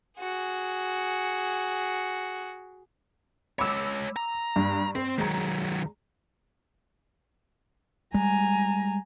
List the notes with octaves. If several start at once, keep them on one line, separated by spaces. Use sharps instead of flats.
F#4 G#4
G#3 C#5 B5 D6 E6
A#5
G2
C4 C5
D#3 F#3 G#3 A#5
G3 G#3 G#5 A#5